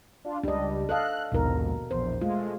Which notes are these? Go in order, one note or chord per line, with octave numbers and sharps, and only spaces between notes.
D4 F4
C#2 G3 D4 D#5
A4 D#5 F5 F#6
A#1 D#2 G#2 B2 A#4
A#1 E2 C5
G#3 A3 F4